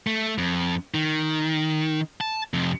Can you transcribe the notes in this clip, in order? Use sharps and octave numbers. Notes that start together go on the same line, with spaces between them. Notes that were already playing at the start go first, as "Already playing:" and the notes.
A3
F2
D#3
A5
F2 C3